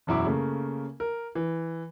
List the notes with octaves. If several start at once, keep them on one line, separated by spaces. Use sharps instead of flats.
E1 F#2 E4 D6
C#3 A3 A#3
A#4
E3